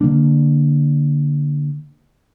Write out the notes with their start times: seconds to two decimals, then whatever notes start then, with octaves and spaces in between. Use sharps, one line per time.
0.01 D3 F#3 A#3 D4